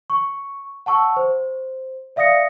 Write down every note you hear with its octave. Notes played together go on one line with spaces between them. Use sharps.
C#6
F#5 A5 C#6 E6
C5
D5 E5 F5 D#6 A#6 C#7